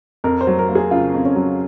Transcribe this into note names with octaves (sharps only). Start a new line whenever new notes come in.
F2 A#4
C5
F#3
A#4
A#3
G#4
C#3 F4
F2
C#4
F#3